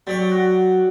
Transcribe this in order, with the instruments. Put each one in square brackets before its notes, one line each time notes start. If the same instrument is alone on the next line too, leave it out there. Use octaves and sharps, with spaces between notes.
[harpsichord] F#3 C#6 [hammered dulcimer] G4 D5
[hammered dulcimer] F#4